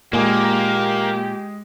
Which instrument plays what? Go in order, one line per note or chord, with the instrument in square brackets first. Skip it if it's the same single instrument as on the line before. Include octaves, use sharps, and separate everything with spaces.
[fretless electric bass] A#2 [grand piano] G#3 G#4 [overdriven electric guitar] A#3 [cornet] G4